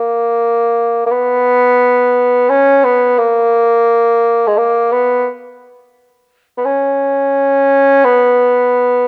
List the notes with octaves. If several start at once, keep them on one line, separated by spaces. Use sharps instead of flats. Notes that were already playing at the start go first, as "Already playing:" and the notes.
Already playing: A#3
A#3
B3
C#4
B3
A#3
G#3
A#3
B3
B3
C#4
B3